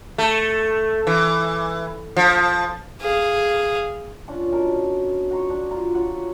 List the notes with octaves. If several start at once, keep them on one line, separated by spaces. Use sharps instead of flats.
A3
E3
F3
G#4 F5
C#4 D4 F4
B2 A#4 A5
F#4 A#5 C6 C#6
D4
F4 D5 A#5
F4 F#4 C#5 F#5